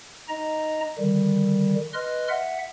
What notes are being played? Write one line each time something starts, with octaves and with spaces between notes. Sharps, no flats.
D#4 D#5 A#5
D3 D#3 G3
B4 D#5 C6 F6
E5 F#5